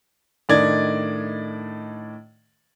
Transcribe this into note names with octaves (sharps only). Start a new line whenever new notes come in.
A2 D#3 D4 D5 D#5 G#6